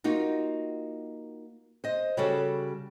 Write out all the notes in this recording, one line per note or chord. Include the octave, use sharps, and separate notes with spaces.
A#3 D#4 F4 F#4
C5 D#5
C#3 G3 F#4 A4